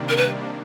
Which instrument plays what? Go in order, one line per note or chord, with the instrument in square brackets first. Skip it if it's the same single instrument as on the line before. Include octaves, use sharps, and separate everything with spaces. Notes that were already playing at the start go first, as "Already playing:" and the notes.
Already playing: [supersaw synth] C3 D#3 G3 A#3 D4
[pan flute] A#4
B4